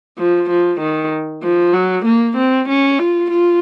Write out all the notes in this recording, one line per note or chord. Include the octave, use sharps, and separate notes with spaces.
F3
F3
D#3
F3
F#3
A#3
C4
C#4
F4
F4